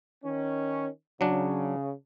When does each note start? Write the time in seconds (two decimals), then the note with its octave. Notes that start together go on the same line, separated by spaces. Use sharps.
0.24 D#3 C#4
1.21 C#3 F#3 D4